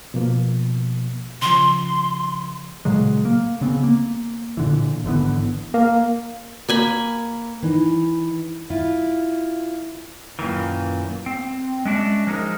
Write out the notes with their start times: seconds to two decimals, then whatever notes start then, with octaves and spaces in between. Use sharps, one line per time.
0.14 B2 F3 A#3
1.42 C#3 F3 C6
2.85 A#2 C#3 F#3 G#3
3.25 A#3
3.61 C#3 B3 C4
3.83 A#3
4.57 A#2 D3 E3
5.05 G#1 D3 E3 B3
5.74 A#3
6.69 A#3 G#5 B5
7.62 E3 D#4
8.70 E4 F4
10.39 F#2 A#2 D#3 E3
11.26 C4
11.85 G#3 C#4 D4 F#4 E5
12.27 F3 G#3 D#4 A#4